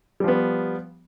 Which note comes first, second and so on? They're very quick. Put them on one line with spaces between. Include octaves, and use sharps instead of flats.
G3 F3 B3